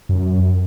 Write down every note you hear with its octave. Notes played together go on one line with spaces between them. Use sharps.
F#2